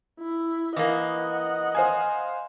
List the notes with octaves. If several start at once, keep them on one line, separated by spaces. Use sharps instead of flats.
E4
E3 A#3 D#5 F#5
C5 F5 G#5